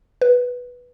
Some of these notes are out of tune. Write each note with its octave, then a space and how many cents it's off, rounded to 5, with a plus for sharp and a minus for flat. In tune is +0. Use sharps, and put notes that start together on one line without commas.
B4 -5